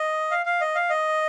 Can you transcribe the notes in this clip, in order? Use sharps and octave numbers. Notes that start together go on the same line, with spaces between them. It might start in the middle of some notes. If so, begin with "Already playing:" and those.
Already playing: D#5
F5
F5
D#5
F5
D#5